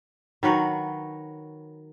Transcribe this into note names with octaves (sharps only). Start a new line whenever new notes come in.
D#3 F#3 B4 C#5